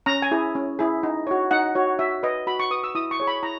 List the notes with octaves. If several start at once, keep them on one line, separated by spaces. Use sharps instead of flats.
C#4 A#5
G#5
E4 G#4
C#4
E4 G#4
D#4
F#4 C#5
D#4 F#5
F#4 C#5
F#4 E5
B4 D#5
F#4 B5
C#6
B4 D#6
E6
E4 D#6
C#6
G#4 C#5
B5
E4 A#5